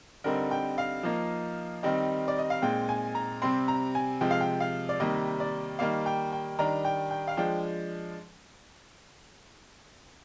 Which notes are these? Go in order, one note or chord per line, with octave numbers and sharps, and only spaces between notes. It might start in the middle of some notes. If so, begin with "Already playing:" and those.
D3 G3 C4 D#4 A#4
G5
F5
F3 A#3 D#4
D#3 G3 C4 D#4
D5
D#5
F5
A#2 G#3 C4 D#4 G5
G#5
A#5
C3 G3 C4 C6
A#5
G#5
C3 F3 G#3 G5
F5
G5
F5
D5
C3 D#3 G3 A#3 D#5
D5
D#3 G3 A#3 F5
G5
G5
D#3 G3 D4 A#5
G5
G5
F5
F3 G#3 D4 G5